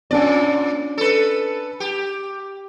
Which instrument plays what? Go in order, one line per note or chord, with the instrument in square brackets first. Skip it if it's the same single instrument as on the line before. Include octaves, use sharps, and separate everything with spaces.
[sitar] A#2 D5 [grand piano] C#4 D4 G#5
[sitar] A4 B4
G4